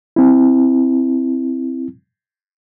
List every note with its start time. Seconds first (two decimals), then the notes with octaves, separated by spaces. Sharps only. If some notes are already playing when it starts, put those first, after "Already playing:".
0.16 C4 E4